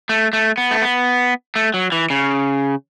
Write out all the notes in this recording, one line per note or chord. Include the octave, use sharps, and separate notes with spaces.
A3
A3
B3
A3
B3
A3
F#3
E3
C#3